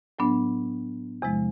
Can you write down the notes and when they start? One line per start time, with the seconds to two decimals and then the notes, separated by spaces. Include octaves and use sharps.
0.19 A2 F#3 B3 D4
1.22 E2 C3 F3 G#3